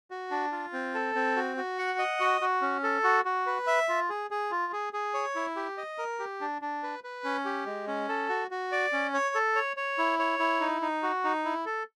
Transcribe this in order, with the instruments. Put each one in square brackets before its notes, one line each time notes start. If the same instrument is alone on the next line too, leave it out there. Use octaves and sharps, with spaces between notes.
[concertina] F#4
D4
F4
C4
A4
C4
F#4
F#4
F#5
D#5
F#4
F#4
C#4
A4
F#4
F#4
B4
E5
F4
G#4
G#4
F4
G#4
G#4
C#5
E4
G4
D#5
A#4
G4
D4
D4
B4
B4
C#4
G4
G#3
C#4
A4
F#4
F#4
D5
C#4
C#5
A4
C#5
C#5
E4
C#5
E4
D#4
D#4
F#4
D#4
E4
A4